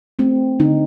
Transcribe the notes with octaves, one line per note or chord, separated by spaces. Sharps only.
A3 C4
D3 D#4